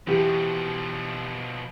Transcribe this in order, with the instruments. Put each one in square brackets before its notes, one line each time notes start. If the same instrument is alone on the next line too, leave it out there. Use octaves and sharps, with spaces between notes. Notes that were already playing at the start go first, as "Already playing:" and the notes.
[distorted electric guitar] B2 F3 [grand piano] E3 G4